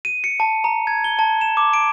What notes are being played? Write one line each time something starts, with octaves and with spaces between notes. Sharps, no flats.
D#7
C#7
A5
A#5
G#6
G7
A5
E7
D6
D7